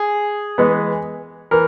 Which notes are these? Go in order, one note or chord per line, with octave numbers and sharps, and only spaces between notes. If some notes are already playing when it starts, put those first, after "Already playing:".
Already playing: G#4
E3 G#3 B3
E3 A#4